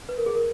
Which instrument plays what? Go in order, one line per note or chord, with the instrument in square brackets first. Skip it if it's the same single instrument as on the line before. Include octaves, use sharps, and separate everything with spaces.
[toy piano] B4
A#4
G#4
A#4